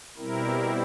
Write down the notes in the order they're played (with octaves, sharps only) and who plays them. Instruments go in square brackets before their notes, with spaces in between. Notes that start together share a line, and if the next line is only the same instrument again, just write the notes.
[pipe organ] B2 G3 C4 E4 A#4